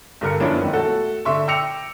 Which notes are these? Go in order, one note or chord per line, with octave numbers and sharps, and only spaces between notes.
G2 D3 A#4 C#7
F#2 F3 B3 C#4 D4 E4
E1 D#3
A3 F#4 A4
D3 E5 C6 C#6
G5 D6 E6 A#6 C#7 F7